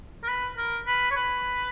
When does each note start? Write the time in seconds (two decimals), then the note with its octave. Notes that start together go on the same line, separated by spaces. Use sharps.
0.23 A#4
0.28 B4
0.57 A#4
0.86 B4
1.11 C#5
1.16 B4